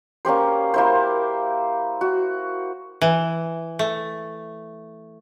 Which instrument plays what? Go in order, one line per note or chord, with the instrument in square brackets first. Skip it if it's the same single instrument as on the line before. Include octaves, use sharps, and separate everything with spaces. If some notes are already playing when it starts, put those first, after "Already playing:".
[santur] A#3 C#4 G4 C5
A#3 E4 C5
F#4
[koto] E3
A3